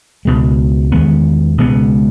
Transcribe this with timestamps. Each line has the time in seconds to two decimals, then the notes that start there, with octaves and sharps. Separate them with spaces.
0.25 C#2 B2 G#3
0.92 E2 D#3 G#3 B3
1.58 C#2 B2 G#3 B3